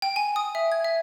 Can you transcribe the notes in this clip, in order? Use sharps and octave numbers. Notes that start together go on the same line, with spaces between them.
G5
G#5
D#6
E5
G#6
E5